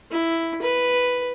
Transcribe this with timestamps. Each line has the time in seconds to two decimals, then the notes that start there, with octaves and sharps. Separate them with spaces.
0.11 E4
0.62 B4